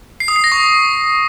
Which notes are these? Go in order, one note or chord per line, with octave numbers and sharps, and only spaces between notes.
C7
D#6
C7
A#6
C#6